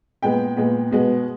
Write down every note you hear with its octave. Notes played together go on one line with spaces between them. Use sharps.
A#2 G#3 B3 G5
A#2 G#3 B3
B2 G#3 B3